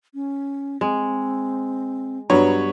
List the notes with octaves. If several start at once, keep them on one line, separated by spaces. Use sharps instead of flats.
C#4
G#3 C4
G2 F#3 B3 C#5 A#5